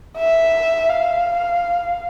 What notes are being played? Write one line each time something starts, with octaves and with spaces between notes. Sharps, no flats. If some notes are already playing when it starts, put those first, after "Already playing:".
E5
F5